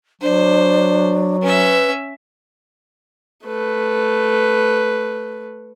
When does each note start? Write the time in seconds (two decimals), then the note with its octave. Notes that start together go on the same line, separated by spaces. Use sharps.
0.21 F#3 D4 C5
1.42 C#4 B4 E5
3.45 A3 B4